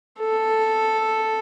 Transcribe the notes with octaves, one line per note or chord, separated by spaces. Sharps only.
A4